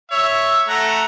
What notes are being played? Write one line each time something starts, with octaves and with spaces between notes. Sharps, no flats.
C#5 E5
A3 F#5 A#5